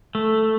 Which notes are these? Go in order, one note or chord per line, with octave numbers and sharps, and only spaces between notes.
A3